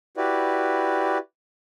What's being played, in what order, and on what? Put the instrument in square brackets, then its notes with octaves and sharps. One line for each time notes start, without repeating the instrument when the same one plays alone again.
[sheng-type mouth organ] E4 F#4 G4 B4 D5